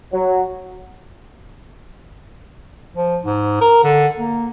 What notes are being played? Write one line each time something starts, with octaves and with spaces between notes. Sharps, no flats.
F#3
F3
G#2
A#4
D3
A#3